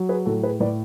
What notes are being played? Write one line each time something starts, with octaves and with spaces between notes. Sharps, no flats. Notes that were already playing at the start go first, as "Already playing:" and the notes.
Already playing: F#3
G#4 B4
A2 F#4 A4
G#4 B4
A2 B4 D5